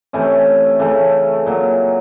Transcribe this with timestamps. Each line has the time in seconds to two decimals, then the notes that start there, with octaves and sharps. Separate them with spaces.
0.13 C3 E3 A3 C#4
0.79 C#3 E3 A3
1.46 A#2 F#3